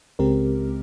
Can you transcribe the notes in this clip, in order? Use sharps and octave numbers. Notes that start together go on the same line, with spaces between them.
C#2 C#3 G#3 C4 G4 A#4